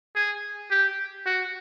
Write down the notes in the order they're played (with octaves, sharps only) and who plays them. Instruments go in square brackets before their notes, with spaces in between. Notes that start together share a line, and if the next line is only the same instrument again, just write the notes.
[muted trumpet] G#4
G4
F#4